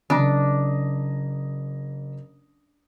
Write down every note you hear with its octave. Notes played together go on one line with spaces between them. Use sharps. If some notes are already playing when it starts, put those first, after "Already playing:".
F#1 D4 A#5 D#6